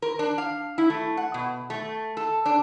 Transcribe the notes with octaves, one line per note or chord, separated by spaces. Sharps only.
A#4
D4
F5
E4
A3
F#5
B2
A3
A4
D4